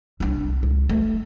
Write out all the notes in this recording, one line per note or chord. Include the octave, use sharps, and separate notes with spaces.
C2 D4
C#2
A3